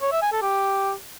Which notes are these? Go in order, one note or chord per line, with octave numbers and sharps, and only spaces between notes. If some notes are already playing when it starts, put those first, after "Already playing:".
C#5
E5
G#5
A4
G4